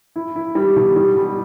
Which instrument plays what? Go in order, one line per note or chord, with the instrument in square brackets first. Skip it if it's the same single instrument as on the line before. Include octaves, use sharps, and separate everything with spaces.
[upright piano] E4
E4
G3
B2
G3
G3